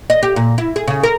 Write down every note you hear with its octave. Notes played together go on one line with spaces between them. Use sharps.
D#5
G4
A#2
E4
G#4
C#3
A#4